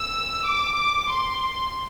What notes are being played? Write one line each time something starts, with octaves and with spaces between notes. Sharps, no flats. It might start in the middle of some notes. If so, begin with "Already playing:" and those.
Already playing: E6
D6
C6